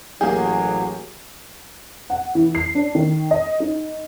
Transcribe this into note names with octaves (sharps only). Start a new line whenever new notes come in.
A1 F#3 A#3 G4 G#4
F#5
E3
C7
D4
D#3
D#5
D#4